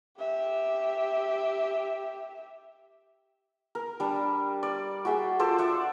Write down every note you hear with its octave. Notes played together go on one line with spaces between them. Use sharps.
G4 E5
A#4
G3 D4
D5
F#4 G#4 E5 G5
F4 A4 C5 D5
D5 E5 F#5